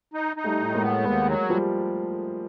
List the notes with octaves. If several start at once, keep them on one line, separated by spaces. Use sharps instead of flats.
D#4
D#4
G3 A3
A2
G#3 A#3
B3
D#2 G#3 A#3
F#3
F3 G3